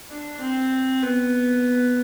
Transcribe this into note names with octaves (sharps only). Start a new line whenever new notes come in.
D4
C4
B3